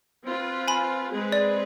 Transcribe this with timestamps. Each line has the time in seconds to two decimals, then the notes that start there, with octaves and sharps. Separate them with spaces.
0.24 C4 F4 B4
0.68 G#5 B5
1.11 G#3 C4 G#4 B4
1.32 D5